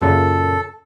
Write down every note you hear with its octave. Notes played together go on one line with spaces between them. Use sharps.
F#2 A#2 C#3 A4